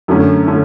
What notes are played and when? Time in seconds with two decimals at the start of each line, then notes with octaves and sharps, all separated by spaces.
0.08 F#2 D3 A3 C#4
0.47 D3 A3 C#4